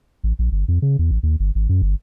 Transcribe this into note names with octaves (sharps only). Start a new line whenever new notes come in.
A1
A#1
G1
F2
C#3
E2
A1
D#2
G1
G#1
F#2
G1